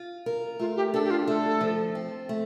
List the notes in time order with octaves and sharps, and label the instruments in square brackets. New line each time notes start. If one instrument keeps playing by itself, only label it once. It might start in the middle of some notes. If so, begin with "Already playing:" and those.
Already playing: [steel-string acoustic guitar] F4
A#4
[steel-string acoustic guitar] A3 [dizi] F4
[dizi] G4
[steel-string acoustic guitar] D4 [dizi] A4
[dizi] G4
F4
[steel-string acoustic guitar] A3 [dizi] A4
[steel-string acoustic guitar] F3
C4
A3